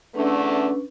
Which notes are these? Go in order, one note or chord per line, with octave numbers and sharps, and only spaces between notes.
E2 D3 A3 C#4 D4 B4